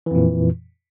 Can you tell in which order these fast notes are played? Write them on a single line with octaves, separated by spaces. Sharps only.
E3 F2 A#2